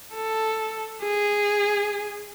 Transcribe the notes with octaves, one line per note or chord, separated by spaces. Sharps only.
A4
G#4